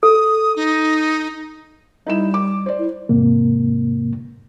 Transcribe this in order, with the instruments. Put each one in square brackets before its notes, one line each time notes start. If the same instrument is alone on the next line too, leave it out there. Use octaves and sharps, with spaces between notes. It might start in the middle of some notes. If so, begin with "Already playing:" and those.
[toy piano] A4 [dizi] D#6
[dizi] D#4
[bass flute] G3 [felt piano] D#4 E4 E7
[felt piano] D6
C5 D5
[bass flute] E4
[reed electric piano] E2 G#2 C3 A#3